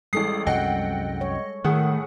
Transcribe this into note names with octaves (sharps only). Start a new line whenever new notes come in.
A1 G3 G#3 A4 D#6 C7
C2 F#2 F#3 D#5 F#5 G5
C#5
A2 D#3 A3 G#4 F#5